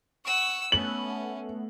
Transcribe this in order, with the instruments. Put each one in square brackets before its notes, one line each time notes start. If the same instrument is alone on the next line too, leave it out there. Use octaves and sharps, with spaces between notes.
[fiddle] F#5 E6 [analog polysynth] C#6
[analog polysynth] A3 B3 [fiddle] C#4 [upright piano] F#7